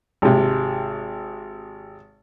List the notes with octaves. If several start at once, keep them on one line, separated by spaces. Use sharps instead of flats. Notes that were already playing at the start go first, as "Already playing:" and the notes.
G#1 C3